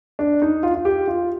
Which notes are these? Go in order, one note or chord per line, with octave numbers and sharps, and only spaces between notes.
D4
D#4
F4
F4
G4
F4